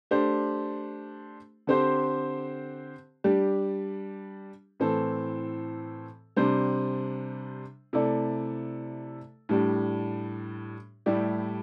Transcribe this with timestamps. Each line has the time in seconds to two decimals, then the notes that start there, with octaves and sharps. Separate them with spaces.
0.11 A3 D4 G4 C5
1.67 D3 C4 G4 C5
3.24 G3 D4 G4
4.80 A2 E3 C4 A4
6.36 C3 G3 D4 C5
7.93 C3 A3 E4 A4 D5
9.49 A2 G3 D4 G4
11.06 A2 G3 E4 G4 D5